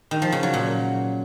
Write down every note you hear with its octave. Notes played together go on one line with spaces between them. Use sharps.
D#3
F3
C#3
F#3
A#2